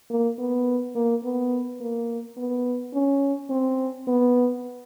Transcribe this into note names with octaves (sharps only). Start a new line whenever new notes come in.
A#3
B3
A#3
B3
A#3
B3
C#4
C4
B3